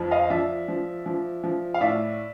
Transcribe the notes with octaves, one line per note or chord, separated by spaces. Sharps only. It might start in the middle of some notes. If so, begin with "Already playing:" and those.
Already playing: F2 F3
D#5 F5
F3 D5 E5
F3
F3
F3
F5
A2 D5 E5